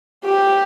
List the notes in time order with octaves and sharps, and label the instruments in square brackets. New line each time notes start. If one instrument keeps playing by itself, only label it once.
[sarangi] G4